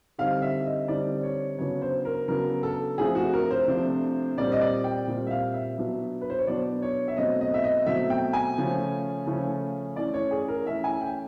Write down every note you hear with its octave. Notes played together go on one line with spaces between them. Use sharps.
D3 G3 C4 D#4 F5
E5
D#5
D3 G3 C4 D#4 D5
C#5
C#3 F#3 B3 D4 C#5
C5
A#4
C#3 F#3 B3 D4 A#4
A4
C3 F3 A3 D4 G#4
F#4
A#4
C5
C3 F3 A3 D4
A#2 G3 C4 D5
D#5
D5
G5
A#2 G3 C4
E5
F5
E5
B2 F#3 B3 D4
B4
C5
C#5
B2 F#3 B3 D4 D5
C#5
E5
B2 F#3 A3 C4 D#5
D#5
E5
D#5
B2 F#3 A3 C4 E5
G5
G#5
C#3 F3 A3 C#4
C#3 F3 A3 C#4
E3 A3 C#4 D5
C#5
G#4
A#4
E3 A3 C#4 E5
G#5
G5